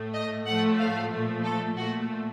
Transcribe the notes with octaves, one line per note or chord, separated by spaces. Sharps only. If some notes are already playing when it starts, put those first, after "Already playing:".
Already playing: A2 A3
D#5
A2 F3 A3 F#5
F5
A#2 F3 A3
A4
A#2 A3 F#4